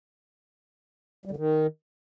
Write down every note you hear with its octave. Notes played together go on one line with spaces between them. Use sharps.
G3
D3
D#3